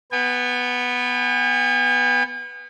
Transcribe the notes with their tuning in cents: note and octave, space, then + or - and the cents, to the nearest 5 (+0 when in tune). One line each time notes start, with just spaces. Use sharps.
B3 +0 G#5 -45